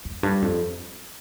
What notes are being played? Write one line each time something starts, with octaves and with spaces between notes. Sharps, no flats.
F2
G2
F2